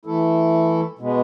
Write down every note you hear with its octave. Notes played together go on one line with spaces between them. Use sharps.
E3 A3 E4 A4
B2 G#3 B3